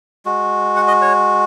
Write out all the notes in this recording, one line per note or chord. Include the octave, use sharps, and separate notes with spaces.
G#3 F#4
F#5
D#5
C#5